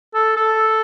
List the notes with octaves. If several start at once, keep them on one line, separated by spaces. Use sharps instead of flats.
A4
A4